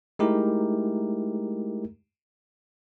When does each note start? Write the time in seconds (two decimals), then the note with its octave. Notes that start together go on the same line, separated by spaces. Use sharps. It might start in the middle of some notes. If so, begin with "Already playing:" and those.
0.19 G#3 A3 D#4 E4 G4 A#4